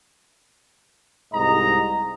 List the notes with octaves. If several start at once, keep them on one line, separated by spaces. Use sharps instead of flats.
C2 G#2 D#5 A#5